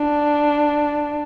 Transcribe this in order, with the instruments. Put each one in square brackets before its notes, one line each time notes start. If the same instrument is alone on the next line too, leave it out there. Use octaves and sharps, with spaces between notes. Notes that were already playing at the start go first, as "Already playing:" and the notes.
Already playing: [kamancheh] D4